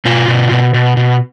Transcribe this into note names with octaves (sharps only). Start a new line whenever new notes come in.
B2 F4
B2
B2
B2
B2